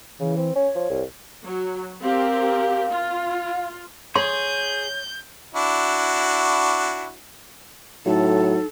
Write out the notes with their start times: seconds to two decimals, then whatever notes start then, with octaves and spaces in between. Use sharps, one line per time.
0.20 C#3 E3
0.37 C4
0.56 C#4 C#5
0.75 F3
0.90 C2
1.44 F#3
2.02 C4 G4 A#4 F5
2.91 F4
4.16 G#4 C#5 C6 G6
5.54 D4 E4 F#4
8.06 A2 F#3 D#4 A4